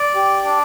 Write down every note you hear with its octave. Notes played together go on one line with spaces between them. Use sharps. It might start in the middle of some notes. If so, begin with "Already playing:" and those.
Already playing: D5
G4
D4